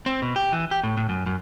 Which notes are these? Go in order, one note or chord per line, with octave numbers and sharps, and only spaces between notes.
C4
B2
G4
E3
G4
A2
A2
F#2
F#2